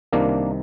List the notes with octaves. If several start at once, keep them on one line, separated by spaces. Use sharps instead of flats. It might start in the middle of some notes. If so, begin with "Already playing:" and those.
C2 C3 D#3 A#3 D4